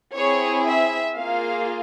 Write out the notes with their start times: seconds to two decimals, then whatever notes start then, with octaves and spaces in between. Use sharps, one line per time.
0.14 C4 E4 G#4 C#5
0.65 E5
1.16 A#3 F4 G#4 F5